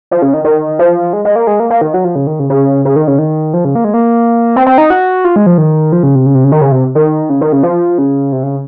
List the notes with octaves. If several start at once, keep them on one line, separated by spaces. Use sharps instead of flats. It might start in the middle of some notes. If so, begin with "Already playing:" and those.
F3
C#3
D#3
D#3
F3
G#3
G#3
A#3
G#3
A#3
A#3
D#3
F#3
F3
C#3
D#3
C#3
C#3
C#3
D#3
C#3
D#3
F3
C#3
A#3
G#3
A#3
C4
C4
D#4
F#4
F4
G#3
F3
D#3
F3
C#3
C3
C#3
C3
C#3
D#3
C#3
C3
D#3
C#3
D#3
C#3
F3
C#3
C3
C#3